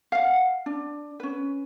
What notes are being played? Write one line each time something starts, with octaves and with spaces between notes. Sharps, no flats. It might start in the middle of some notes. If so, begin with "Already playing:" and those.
F5 F#5
D4
C#4 B4